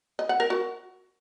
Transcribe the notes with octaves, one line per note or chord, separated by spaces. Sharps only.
D#5
F#5
A#4
F#4